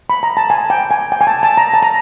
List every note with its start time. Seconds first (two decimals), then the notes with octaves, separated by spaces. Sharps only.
0.10 B5
0.23 A#5
0.37 A5
0.50 G#5
0.70 G5
0.91 G#5
1.12 G5
1.21 G#5
1.27 A5
1.43 A5
1.58 A#5
1.74 A5
1.83 A#5